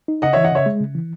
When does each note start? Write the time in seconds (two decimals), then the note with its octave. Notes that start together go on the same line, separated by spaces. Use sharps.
0.08 D#4
0.22 C#3 D#5 F#5
0.33 E3 C#5 E5
0.44 D#5 F#5
0.52 C#3 C#5 E5
0.66 G#3
0.80 C#3
0.95 E3